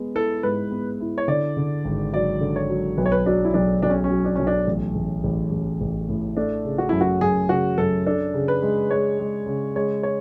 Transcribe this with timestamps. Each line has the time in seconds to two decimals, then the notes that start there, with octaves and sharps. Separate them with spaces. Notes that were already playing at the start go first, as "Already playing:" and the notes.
Already playing: G#3 B3
0.15 E4 A4
0.43 G#2 B4
0.71 B3
1.01 E4
1.18 C#5
1.28 D3 D5
1.57 D3
1.85 G#1
2.14 F#3 D5
2.41 D3
2.56 C#5
2.70 F#3
2.97 B1 B4
3.06 C#5
3.12 B4
3.26 F#3 D4
3.45 E4
3.54 B1 D4
3.82 B1 D4
3.90 C#4
4.04 C#4
4.10 F#3
4.25 D4
4.35 B1 C#4
4.47 D4
4.67 A1
4.95 A1
5.24 A1
5.52 A1
5.81 A1
6.09 A2
6.37 A3 D4
6.65 C#3
6.78 F#4
6.89 F#2 E4
7.01 F#4
7.21 F#2 G#4
7.49 C#3 F#4
7.78 F#2 A4
8.06 D4 A4
8.34 C#3
8.48 B4
8.62 G#3
8.90 G#3 C#5
9.20 G#3
9.47 C#3
9.76 G#3 C#5
10.03 C#5